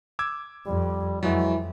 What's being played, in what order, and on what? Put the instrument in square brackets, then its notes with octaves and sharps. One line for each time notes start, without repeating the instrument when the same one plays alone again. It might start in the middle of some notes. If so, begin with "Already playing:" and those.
[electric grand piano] D6 E6 G#6
[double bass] F2 [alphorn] G3
[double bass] F2 [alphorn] E3 [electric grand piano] F#3 G#3 F#4